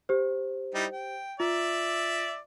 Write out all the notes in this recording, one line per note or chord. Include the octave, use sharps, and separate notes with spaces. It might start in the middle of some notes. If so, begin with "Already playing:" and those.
G4 C5
G3 D#4 E4
G5
F4 D5 E5